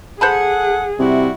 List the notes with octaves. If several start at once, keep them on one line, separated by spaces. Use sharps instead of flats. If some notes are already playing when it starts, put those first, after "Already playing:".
G#4 A4 C5 F#5 A5 B5
C3 G3 E4 F#4